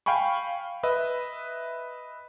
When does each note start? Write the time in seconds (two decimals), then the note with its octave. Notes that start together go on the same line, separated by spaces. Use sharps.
0.06 F5 G5 G#5 B5 C#6
0.83 B4 D#5 E5